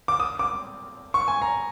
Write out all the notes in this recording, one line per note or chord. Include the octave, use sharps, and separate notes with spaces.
D6
D#6
D6
C#6
G#5
A#5